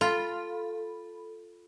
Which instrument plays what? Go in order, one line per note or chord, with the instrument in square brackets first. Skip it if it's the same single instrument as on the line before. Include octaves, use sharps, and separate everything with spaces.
[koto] F4 [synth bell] A4 B5